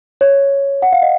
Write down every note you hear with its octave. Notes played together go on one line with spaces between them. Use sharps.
C#5
F#5
F5
D#5